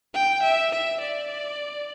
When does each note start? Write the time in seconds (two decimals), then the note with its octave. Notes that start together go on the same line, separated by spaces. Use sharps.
0.14 G5
0.43 E5
0.72 E5
1.00 D5